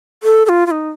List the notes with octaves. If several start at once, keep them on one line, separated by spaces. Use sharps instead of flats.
A4
A4
F4
F4
D#4